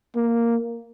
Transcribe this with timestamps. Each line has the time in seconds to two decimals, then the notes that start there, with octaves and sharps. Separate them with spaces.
0.16 A#3